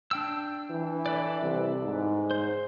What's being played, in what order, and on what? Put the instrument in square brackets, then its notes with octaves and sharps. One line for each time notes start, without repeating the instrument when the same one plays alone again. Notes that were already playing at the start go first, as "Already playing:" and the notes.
[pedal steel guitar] D4 G5 E6
[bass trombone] E3
[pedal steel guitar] A4 B4 D5
[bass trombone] C2
G#2
[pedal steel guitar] C5